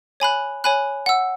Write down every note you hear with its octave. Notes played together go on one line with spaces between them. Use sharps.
C#5 G#5 B5 F#6
C#5 G#5 B5 F#6
F#5 E6